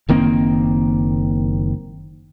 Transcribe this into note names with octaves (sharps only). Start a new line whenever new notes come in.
F#1 D#3 A#3 C4